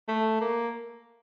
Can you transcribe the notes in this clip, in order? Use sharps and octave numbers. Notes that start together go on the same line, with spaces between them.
A3
A#3